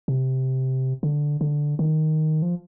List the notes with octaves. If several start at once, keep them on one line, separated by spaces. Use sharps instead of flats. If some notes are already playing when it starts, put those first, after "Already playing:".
C3
D3
D3
D#3
F3